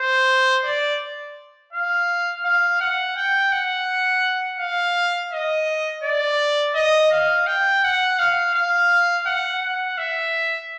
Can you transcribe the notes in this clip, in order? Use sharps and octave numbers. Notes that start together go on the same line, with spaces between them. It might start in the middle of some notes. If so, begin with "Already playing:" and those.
Already playing: C5
D5
F5
F5
F#5
G5
F#5
F5
D#5
D5
D#5
F5
G5
F#5
F5
F5
F#5
F#5
E5